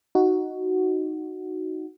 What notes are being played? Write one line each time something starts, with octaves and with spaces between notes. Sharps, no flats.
D#4 F#4